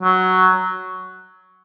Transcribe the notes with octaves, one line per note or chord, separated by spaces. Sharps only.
F#3